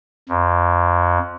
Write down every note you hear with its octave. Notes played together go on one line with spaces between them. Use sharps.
F2